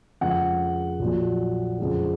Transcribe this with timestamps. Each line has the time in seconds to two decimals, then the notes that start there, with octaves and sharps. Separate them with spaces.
0.21 F2 C#3 F3 G#3 F#5
1.00 A#1 A#2 F#3
1.79 F2 C#3 F3 G#3